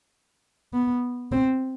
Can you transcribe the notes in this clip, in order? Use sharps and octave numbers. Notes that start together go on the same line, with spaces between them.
B3
C4